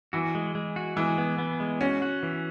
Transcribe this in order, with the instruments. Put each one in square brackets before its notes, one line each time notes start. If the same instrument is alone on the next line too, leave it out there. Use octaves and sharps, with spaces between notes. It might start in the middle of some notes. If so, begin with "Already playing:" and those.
[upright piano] E3 [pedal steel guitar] F#4
[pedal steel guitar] G#3
G#3
F#4
[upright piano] E3 [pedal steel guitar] G#3
[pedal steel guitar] B3
B3
G#3
[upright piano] C#4 [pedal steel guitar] F#4
[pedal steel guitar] F#4
E3